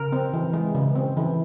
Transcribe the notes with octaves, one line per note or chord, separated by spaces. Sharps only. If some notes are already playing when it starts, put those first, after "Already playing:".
Already playing: C#3 A#4
C4
E3
G#3
C#3
C4
E3